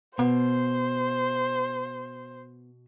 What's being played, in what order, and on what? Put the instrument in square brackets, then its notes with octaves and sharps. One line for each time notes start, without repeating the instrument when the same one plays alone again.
[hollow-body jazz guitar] B2 [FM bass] B3 [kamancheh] C5